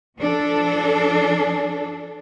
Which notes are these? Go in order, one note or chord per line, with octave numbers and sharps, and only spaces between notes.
F3 D4 A4